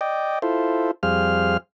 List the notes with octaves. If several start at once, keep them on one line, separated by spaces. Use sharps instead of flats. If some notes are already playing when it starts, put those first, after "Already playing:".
D5 D#5 G5
E4 F4 A4 C5
F2 G3 G#4 C5 F5 F6